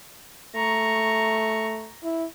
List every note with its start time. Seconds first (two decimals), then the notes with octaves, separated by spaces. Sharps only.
0.55 A3 A#5 C#6
2.03 E4